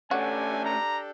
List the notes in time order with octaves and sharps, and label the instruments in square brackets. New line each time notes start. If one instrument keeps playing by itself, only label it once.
[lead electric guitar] A3 C#4 [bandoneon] D4 G4 A4 [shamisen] F#4 [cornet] G#5
[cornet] A#5